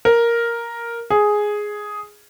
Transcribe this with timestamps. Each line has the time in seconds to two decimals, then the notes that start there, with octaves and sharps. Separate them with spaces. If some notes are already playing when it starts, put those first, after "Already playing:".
0.05 A#4
1.10 G#4